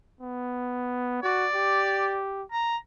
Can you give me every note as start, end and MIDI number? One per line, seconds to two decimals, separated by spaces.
0.21 1.18 59
1.23 1.46 66
1.23 2.18 74
1.55 2.43 67
2.52 2.76 82